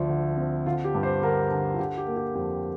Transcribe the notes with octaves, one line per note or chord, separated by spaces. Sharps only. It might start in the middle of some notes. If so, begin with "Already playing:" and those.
Already playing: D2 F3 D5
D3
C4
D3 F4
G4
G2
C5
D3 A#4
D3
F4
D3 G4
G4
A#3
G4
F2 G4